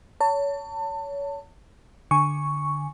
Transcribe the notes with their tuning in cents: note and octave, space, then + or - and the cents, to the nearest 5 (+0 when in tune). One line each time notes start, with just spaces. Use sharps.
C#5 +30 A5 +30
D3 +5 G#5 +0 C#6 +0